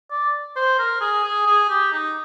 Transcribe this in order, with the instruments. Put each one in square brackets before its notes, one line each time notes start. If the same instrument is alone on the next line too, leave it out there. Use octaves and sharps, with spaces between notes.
[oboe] D5
C5
A#4
G#4
G#4
G#4
G4
D#4